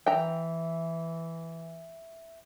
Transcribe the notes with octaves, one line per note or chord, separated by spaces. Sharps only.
E3 E5 G5 A#5